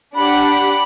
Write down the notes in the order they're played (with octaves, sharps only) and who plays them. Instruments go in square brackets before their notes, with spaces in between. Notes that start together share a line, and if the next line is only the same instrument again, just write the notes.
[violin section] D4 G4 D5 F#5 [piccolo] B5